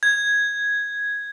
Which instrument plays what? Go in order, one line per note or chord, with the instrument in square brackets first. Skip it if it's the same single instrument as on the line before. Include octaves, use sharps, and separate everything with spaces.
[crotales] G#6